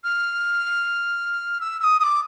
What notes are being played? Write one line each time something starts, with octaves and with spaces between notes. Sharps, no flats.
F6
E6
E6
D#6
D#6
D6